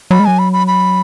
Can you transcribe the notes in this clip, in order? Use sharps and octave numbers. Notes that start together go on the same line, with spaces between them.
F#3 B5
G#3
F#3 G#5
B5
B5
B5